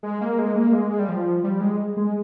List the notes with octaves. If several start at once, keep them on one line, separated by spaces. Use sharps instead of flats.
G#3
A#3
G#3
A#3
G#3
G3
F3
G3
G#3
G#3